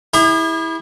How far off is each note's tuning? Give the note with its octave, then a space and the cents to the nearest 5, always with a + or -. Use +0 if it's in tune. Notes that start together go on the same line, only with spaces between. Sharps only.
E4 -20 G#4 -45